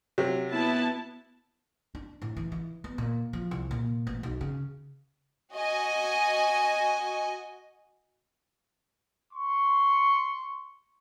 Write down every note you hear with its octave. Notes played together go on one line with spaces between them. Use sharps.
C3 F#3
B3 E4 A5
D4
A2
E3
E3
B3
A#2
F3
C2
A#2
A1
B1
C#3
F#4 D#5 G#5
C6 C#6